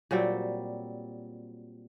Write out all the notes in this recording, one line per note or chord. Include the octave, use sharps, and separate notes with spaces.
A#2 F#3 G3 C4